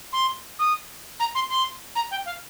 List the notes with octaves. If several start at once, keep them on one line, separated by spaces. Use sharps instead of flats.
C6
D#6
A#5
C6
C6
A#5
G5
F5